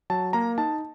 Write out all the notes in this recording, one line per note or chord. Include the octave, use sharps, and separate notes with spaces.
F#3 A5
A#3 A#5
D#4 A5